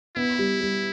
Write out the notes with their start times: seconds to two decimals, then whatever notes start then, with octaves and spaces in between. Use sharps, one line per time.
0.16 B3 E4
0.39 G3
0.61 G3